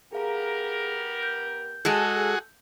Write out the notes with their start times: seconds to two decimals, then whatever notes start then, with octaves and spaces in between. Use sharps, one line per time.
0.13 B3 G4 G#4 A#4 F5 A#5
1.23 G6
1.85 G#3 F#4 G#4 A4